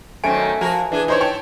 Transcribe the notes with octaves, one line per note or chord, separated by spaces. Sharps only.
F#2 D#3 A3 C4 E5 G#5 D7
F3 F#4 A#4
E3 D4 G#4
D#4 E4 C5 C#5
C#5 G5 A5